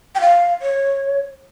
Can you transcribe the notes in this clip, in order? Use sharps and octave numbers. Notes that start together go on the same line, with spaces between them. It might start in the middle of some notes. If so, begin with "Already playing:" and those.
G5
F5
C#5